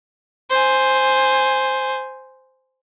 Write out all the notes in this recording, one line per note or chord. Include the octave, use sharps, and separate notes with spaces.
C5 G#5